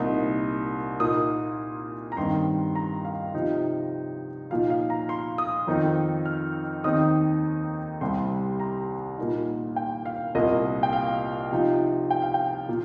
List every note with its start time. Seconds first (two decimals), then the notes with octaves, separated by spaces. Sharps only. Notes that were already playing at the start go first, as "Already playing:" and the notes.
Already playing: C2 A#2 A#3 D#4
1.00 A#2 A#3 D#4 D#6
2.12 A#5
2.17 G2 D#3 C4 D#4 C6
2.75 A#5
3.05 F5
3.34 C3 F3 D#4
4.51 A#2 F3 D#4 F5
4.70 F5
4.90 A#5
5.09 C6
5.38 D#6
5.67 F2 D#3 C4 D#4
6.26 F6
6.84 D#2 D#3 C4 D#4 D#6
8.01 C2 C3 G3 C6
8.60 A#5
9.18 A#2 A#3 D#4
9.76 G5
10.06 F5
10.35 C2 A#2 A#3 D#5
10.83 G5
10.93 F5
11.52 C3 F3 D#4
12.11 G5
12.22 F5
12.34 G5
12.68 A#2